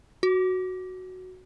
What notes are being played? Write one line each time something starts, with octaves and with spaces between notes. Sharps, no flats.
F#4